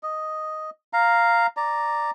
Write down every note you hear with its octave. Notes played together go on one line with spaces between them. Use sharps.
D#5
F5 A#5
D5 A#5